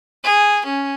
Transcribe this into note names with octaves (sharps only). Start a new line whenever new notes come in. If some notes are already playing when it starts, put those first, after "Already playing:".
G#4
C#4